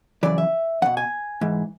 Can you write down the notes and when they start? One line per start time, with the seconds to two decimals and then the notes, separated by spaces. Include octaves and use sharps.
0.23 F#2 C#3 E3 D5
0.38 E5
0.82 E2 B2 F#5
0.97 G#5
1.41 G#2 E3